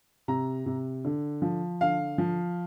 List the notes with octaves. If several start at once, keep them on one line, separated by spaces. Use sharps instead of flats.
C3 A#5
C3
D3
F3
D3 F5
F3